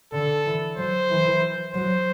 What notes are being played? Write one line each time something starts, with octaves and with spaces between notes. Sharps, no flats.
D3 A4
E3
F#3 C5
E3
F#3 C5